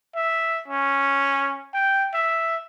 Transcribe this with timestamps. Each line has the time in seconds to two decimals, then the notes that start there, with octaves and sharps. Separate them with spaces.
0.15 E5
0.68 C#4
1.74 G5
2.14 E5